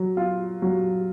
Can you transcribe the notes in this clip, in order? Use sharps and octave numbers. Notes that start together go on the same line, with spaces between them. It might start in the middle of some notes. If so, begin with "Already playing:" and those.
Already playing: F#3
F4
F#3